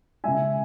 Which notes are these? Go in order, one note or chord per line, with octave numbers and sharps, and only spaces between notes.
C#3 G#3 E5 G#5